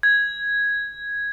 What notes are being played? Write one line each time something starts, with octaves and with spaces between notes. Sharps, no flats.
G#6